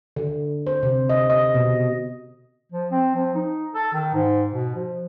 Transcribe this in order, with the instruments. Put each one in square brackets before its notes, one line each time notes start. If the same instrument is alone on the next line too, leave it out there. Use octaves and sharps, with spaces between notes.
[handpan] D3
C5
C3
D#5
D#5
B2
[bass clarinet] F3
C4
F3
D#4
A4
D#3
G#2
B2
F3